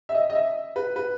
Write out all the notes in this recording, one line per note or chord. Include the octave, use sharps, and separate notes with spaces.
E5
D#5
D#5
E5
B4
B4